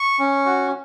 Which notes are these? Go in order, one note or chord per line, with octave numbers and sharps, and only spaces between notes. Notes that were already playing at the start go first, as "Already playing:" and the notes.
Already playing: C#6
C#4
F#4